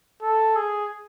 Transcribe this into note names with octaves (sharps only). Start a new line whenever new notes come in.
A4
G#4